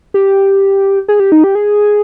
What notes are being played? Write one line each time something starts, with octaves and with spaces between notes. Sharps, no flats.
G4
G#4
G4
D#4
G4
G#4